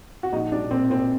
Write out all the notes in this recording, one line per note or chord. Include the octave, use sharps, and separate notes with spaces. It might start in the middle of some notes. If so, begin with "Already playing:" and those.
F#4
A#1 D#4
G3 D4
A#2 C4
A#2 C4